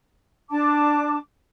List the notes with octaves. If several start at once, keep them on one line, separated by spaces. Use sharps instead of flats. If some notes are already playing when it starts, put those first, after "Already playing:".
D4 A5 D6